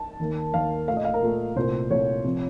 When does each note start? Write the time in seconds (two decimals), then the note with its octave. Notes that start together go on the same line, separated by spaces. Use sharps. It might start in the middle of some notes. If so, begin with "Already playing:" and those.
Already playing: A5
0.19 D#2 D#3 A#3
0.53 D#2 D#3 A#3 F5
0.88 A3 F5
0.91 A#2
0.97 D#5
1.05 F5
1.14 A#4
1.22 A#2 A3
1.56 C2 A#2 A3 C5
1.90 C2 A#2 A3 C#5
2.24 C3 F3